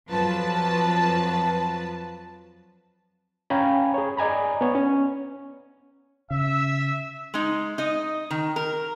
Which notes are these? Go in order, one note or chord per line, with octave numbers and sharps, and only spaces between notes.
F2 F3 F#3 B4 A5
C#4 F5 G5 G#5 A#5 B5
G#4 C#5
D5 D#5 G#5 A#5 B5
B3 C#5
C#4
C#3 E5
G#3 D#4
D#4 D#5
D#3
A#4